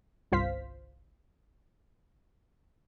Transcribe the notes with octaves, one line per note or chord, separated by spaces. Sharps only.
G1 C2 F4 C5 F5 B6